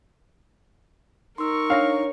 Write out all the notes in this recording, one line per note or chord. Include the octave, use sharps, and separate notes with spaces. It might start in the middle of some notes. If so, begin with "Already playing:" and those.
D#4 A#4 C6 C#6 E6
D4 C#5 F5 A#6